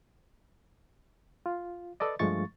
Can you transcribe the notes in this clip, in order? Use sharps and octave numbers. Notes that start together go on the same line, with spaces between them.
F4
A4 B4 D5 D#5
G2 F3 G#3 A3 C#6 A6